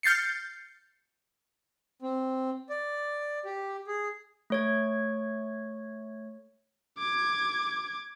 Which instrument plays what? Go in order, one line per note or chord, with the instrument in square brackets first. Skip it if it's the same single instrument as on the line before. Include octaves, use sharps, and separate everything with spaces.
[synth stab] F6 G6 A6 C7 C#7
[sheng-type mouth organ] C4
D5
G4
G#4
[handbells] A3 C#5 G#6
[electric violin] D6 G#6